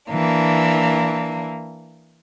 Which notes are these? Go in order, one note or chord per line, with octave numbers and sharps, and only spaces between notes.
E3 A#3 D4